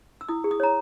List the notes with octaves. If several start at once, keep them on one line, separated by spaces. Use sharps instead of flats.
E6
E4 D#6
G#4
D#6
C#5 A#5